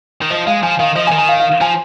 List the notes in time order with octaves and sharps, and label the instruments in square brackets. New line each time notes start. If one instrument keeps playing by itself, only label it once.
[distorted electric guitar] D#3
[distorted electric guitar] F3 [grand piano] D#5
[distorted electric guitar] G#3 [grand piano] F5
[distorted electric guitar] F3 [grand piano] G#5
[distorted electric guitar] D#3 [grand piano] F5
[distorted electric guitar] F3 [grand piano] D#5
[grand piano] G#5
[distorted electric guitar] D#3
[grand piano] G#5
F5
F5
F5
[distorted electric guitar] F3 [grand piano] G#5